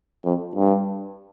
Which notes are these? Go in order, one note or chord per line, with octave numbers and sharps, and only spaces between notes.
F2
G2